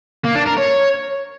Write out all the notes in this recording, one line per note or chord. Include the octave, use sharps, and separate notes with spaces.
A#3
D4
A#4
C#5